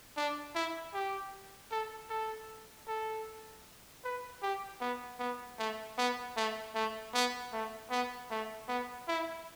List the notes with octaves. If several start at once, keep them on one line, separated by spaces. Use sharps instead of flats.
D4
E4
G4
A4
A4
A4
B4
G4
B3
B3
A3
B3
A3
A3
B3
A3
B3
A3
B3
E4